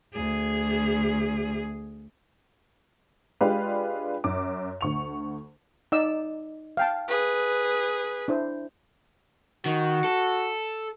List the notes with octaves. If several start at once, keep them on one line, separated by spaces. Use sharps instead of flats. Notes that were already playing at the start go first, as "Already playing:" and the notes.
D2 G#4
G#3 D4 F4 G4 B4 F5
F#2 D6
D2 C#6 F7
D#4 D5 E6
F5 G5 A5
G#4 B4
D4 E4 C5
D#3 F#4
A4